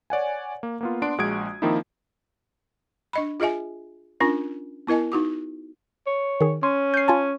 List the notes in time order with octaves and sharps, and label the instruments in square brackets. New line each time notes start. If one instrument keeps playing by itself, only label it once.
[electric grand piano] C#5 D5 F#5 G#5
A#3
A#3 B3 F4
B3 D4 C6 D7
A#1 G#3 F#4 D#6 G#6 D7
D#3 F3 A#3 C4 D#4 E4
[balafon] D4 D#5 B5
F4 G#4 D#5 E5 G#5
C#4 D4 F4 A#4 G#5
B3 E4 A#4 D#5 G#5
D#4 F#4 D6
[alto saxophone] C#5
[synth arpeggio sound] D#3 G#4
[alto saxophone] C#4 [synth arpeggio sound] C6
[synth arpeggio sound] G6 C7
F4 G#5 A5